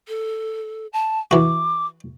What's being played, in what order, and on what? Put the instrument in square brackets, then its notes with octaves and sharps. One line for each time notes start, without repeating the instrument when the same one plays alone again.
[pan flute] A4
A5
[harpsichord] E3 F#4 [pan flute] D6